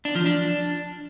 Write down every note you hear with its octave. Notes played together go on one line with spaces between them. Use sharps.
D4
F3
D4